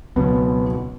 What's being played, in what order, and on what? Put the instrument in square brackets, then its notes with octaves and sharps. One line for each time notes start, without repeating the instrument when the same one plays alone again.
[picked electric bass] C#2 B2 [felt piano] F#3 B3